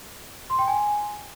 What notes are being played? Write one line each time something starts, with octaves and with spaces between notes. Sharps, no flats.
C6
G5
G#5